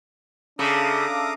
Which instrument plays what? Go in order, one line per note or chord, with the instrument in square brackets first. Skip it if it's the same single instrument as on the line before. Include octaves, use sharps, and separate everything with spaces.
[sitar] C#3 [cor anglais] D4 [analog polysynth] A4 E5 F5 [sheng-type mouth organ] A#5 D6 D#6